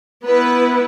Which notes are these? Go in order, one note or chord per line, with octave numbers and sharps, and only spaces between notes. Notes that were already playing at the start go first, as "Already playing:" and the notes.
B3 E4 B4